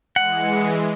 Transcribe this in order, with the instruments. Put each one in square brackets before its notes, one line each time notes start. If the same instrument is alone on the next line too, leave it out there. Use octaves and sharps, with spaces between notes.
[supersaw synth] E3 G#3 [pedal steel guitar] F#5